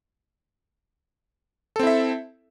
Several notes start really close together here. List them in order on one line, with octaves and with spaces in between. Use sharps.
A4 C4 E4 E5